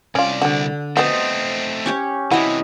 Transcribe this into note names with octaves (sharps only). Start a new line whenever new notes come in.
C2 C#4 F4 D5
D3 D4 F#4
A3 B3 C4 F#4 C5 D#5
C#4 G4 C#5
C3 E3 E4 F#4 D#5